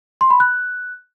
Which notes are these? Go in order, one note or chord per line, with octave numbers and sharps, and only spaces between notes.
C6
B5
F#6